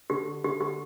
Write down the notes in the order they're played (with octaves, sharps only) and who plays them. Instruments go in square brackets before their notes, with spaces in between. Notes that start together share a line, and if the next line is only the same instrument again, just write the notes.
[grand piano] D3 [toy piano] G4
[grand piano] D3 [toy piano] G4
[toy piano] G4